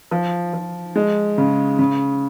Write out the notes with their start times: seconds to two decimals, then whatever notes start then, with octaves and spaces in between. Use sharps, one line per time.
0.11 F3
0.53 F3
0.96 G#3
1.38 C#3
1.79 C#3